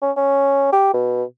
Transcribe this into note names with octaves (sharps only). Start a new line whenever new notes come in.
C#4
C#4
G4
B2